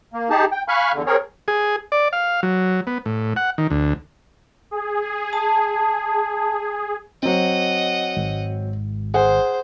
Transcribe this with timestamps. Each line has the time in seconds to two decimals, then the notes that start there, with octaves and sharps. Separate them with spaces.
0.13 A#3
0.30 D#4 G4 G#4 A5
0.52 G5
0.68 F5 G#5 B5 C#6 F6 F#6
0.93 E2 D3
1.06 C4 G#4 A#4 C#5
1.48 G#4
1.92 D5
2.13 F5
2.43 F#3
2.87 B3
3.06 A2
3.36 F#5
3.58 D#3
3.70 D2
4.71 G#4
5.33 A5
7.23 F#3 C4 D#5 F#5
8.17 G#1
9.14 G#4 C5 F#5